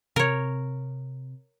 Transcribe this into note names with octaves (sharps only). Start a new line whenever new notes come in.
C3 A#4 C#5